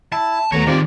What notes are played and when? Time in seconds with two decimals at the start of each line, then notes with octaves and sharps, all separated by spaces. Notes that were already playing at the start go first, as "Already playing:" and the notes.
0.12 E4 A5
0.52 D#2 F#3 A3 B3 C#5 A#5
0.67 D#3 G3 G#3 C4 F4 D5